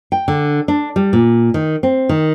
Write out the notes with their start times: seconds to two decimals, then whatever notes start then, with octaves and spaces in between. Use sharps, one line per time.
0.12 G5
0.28 D3
0.68 D4
0.96 G3
1.13 A#2
1.54 D#3
1.83 C4
2.09 D#3